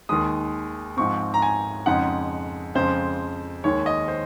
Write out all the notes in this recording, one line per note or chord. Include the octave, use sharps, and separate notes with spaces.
D#2 D#3 G#3 D#6
G#2 F3 G#3 C4 C#6
A#5
G#5
F2 C#3 G#3 D#4 F#5
F2 C#3 F3 G#3 C5
D#2 D#3 G#3 C#5
D#5
C5